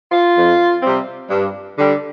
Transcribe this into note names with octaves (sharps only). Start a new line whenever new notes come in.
F4
F2
C3 G3 C4
G2
D3 G3